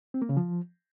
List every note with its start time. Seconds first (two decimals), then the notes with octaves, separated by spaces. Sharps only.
0.14 C4
0.22 A#3
0.29 C#3
0.37 F3